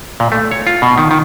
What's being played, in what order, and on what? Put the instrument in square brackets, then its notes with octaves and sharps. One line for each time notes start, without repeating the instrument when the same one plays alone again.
[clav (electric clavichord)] A#2
A3
C#5
F4
B2
D#3
D#3